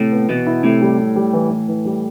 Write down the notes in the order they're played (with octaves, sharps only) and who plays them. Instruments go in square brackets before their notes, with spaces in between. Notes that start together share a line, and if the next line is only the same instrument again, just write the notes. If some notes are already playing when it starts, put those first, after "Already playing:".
Already playing: [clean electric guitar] A2 [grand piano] C3
[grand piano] B3
[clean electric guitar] B2 [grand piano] E3
[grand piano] E4
[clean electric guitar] A2 [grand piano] C3
[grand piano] G3
G3
G3
E3
E3
E3
G3